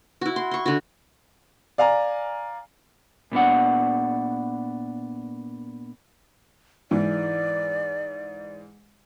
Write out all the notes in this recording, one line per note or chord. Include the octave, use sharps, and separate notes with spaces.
E4 F#4
C6
C6 C#6
D3 F#4
D5 F5 G#5 A#5
A#2 B3 D4 F#5
G#2 E3 D5